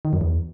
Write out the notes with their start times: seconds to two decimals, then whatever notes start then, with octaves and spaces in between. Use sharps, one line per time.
0.05 D#3
0.13 F#2
0.21 E2